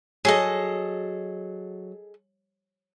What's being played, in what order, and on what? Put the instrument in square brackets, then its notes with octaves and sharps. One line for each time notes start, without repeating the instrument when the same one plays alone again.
[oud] F#3 [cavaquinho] G#4 A4 D#5